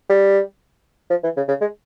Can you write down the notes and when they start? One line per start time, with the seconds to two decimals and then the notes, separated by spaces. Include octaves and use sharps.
0.09 G3
1.10 F3
1.23 E3
1.36 C#3
1.48 C#3
1.61 G#3